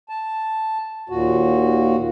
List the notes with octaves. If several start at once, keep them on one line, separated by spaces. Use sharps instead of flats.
A5
D#2 A#2 F#4